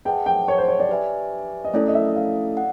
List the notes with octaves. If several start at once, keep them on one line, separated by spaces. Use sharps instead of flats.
G#4 B4 D#5 F#5 G5 A5
G5
C#5
C5
C#5
D5
G4 B4 E5 G#5
D#5
A3 C#4 E4 A4 D5
D#5
E5
F5
F#5